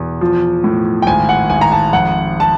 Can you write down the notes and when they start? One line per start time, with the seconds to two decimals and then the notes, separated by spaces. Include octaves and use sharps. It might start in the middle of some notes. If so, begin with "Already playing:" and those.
Already playing: E2 B2
0.21 F3
0.64 A2
1.02 G5
1.07 G#1 G#5
1.29 F#5
1.50 G#1 G#5
1.61 A#5
1.72 A5
1.93 F2 F#5
2.40 A5